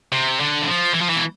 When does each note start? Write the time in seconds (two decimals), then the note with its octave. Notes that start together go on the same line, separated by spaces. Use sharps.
0.12 C3
0.40 D3
0.62 E3
0.68 F3
0.94 E3
1.02 F3
1.10 E3
1.17 B2